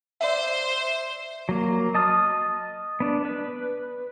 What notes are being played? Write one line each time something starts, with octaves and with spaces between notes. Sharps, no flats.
C5 D5 E5
F#3 A#3
D#5 A5 D#6 F6
B3 D4
B4